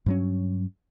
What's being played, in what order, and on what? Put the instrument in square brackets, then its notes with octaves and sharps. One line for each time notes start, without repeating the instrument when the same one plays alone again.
[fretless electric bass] G2 F#3 C#4